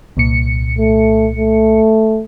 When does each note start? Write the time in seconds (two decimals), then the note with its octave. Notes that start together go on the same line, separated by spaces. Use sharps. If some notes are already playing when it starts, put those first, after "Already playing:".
0.17 C2 A#2 C#7
0.79 A3
1.36 A3